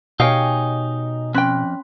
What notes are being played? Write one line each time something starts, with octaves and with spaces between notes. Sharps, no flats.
B2 D#4 G4 C#5 D#5 F5 G5 G#5
F2 C#4 G5 B5 C6 F#6